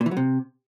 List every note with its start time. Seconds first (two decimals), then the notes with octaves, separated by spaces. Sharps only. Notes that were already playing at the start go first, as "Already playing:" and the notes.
0.01 A#2
0.06 E3
0.11 F#3
0.17 C3